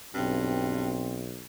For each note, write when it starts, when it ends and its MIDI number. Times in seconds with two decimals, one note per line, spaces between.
0.14 1.45 35
0.14 1.03 43
0.14 1.25 60